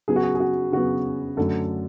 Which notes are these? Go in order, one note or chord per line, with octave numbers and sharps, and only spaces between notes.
C#3 F#3 B3 G#4
F#4
G#4
G#4
F#4
C#3 F#3 B3 F#4
F#2 D3 A3 A4